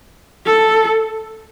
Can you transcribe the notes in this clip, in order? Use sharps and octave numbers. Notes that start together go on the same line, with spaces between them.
A4